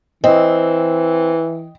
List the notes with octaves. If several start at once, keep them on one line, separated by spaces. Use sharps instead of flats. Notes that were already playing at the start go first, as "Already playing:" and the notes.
E3 C4 D#5